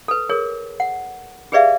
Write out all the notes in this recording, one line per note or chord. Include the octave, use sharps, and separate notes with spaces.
A4 B4
G#4 A#4 C#5
F#5
G4 G#4 B4 D5 E5 F5